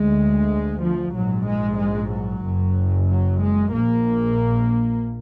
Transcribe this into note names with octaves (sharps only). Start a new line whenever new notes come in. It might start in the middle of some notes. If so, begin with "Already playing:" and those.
Already playing: D2 G#3
F3
A#1 G#2 F#3
G#3
G#3
F#3
F#1 F#2
F#3
G#3
A#1 A#2 A#3